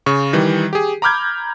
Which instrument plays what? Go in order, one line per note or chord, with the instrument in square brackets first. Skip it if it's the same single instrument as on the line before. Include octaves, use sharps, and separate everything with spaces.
[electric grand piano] C#3 C#6
D#3 E3 G3
G4 G#4
A#5 B5 D6 F6 G6 G#6